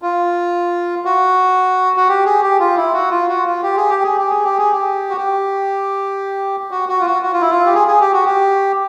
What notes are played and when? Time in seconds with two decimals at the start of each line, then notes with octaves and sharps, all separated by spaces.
0.02 F4
1.05 F#4
1.96 F#4
2.09 G4
2.25 G#4
2.42 G4
2.60 F4
2.77 E4
2.94 F#4
3.11 F4
3.29 F#4
3.46 F4
3.63 G4
3.77 G#4
3.90 G4
4.03 G#4
4.18 G4
4.31 G#4
4.44 G4
4.58 G#4
4.72 G4
5.10 F#4
5.17 G4
6.71 F#4
6.89 F#4
7.01 F4
7.06 F#4
7.22 F#4
7.33 F4
7.41 E4
7.50 F4
7.66 G4
7.75 G#4
7.88 G#4
8.00 G4
8.13 F#4
8.26 G4